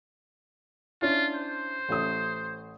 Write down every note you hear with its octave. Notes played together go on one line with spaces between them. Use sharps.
C#4 D4 E4 F4
C5
A1 A3 D#6